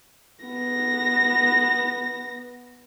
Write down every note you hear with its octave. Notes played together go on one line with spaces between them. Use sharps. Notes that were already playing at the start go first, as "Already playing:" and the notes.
B3 A#6